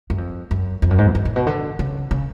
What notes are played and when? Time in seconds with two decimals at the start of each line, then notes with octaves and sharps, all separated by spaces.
0.10 F#2
0.18 F2
0.51 F#2
0.82 F2
0.91 F#2
0.98 G#2
1.07 F2
1.15 F#2
1.25 A2
1.36 B2
1.47 D3
1.79 C#3
2.11 C#3